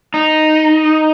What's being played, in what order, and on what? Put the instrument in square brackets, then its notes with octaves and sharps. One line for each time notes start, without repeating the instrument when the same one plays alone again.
[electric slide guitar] D#4